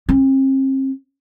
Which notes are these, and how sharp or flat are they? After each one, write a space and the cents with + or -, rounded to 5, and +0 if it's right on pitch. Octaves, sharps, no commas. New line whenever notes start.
C4 +40